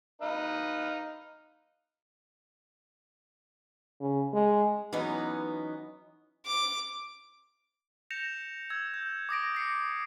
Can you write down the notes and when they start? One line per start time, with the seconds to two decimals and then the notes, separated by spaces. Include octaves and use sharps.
0.21 D#4 B4 F5
4.00 C#3
4.33 G#3
4.93 E3 F#3 B3 C#4 D#4
6.46 D6
8.10 G6 A#6 C#7 E7 F7
8.70 E6 G#6
8.94 G6
9.29 D6 D#6 A#6 D7
9.55 A#6 C7 C#7